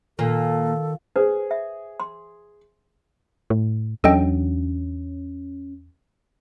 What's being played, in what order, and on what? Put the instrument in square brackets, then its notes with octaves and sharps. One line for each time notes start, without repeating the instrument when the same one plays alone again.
[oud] A#2 [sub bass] D#3 [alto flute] A4
[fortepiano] G#4 [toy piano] B4 C5
[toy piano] E5
C6
[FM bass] A2
[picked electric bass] E2 F#3 D4 [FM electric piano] C#4 [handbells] A4 D#5 G5